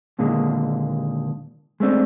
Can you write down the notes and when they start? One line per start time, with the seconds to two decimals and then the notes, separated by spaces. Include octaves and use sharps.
0.19 D#2 A#2 D3 G#3
1.80 G#3 A3 C4 D4